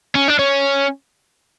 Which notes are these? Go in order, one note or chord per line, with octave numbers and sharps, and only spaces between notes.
C#4
D4
C#4